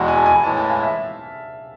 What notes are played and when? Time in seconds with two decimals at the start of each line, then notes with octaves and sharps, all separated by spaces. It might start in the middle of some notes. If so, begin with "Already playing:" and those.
Already playing: E2 B2 G#3 F#5 G5
0.08 G#5
0.17 A5
0.26 G#5
0.36 G#5
0.43 A2 E3 G#3 A5
0.57 A5
0.70 F5
0.83 E5